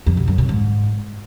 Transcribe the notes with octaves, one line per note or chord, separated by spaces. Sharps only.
F2
B2
F#2
B2
G#2